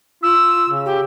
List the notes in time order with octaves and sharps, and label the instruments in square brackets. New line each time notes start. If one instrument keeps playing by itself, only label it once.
[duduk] F4 [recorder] E6
[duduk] C#3
[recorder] G4